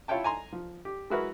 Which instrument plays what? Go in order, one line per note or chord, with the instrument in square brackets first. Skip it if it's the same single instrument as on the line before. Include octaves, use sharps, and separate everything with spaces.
[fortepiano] E4 F4 C#5 E5 G5 A5
G#5 A#5 C6
F3
G4
G#3 E4 F#4 A#4 B4